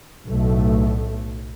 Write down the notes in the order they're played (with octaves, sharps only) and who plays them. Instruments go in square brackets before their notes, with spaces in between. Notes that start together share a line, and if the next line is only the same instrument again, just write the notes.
[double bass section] B1 A2 A3